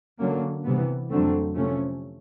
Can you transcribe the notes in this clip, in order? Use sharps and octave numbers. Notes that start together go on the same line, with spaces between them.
D3 F#3 A#3 C#4
C3 E3 G3 B3
F2 D3 F#3 A3 C4
C3 F3 A3 C#4